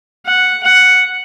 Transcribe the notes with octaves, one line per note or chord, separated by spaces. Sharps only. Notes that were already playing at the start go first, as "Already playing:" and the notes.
F#5
F#5